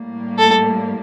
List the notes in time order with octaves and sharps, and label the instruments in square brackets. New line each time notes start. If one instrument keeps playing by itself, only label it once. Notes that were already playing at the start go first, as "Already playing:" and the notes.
Already playing: [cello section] A2 G3 A#3
[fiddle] A4